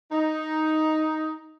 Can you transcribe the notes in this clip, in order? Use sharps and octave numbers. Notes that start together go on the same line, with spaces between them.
D#4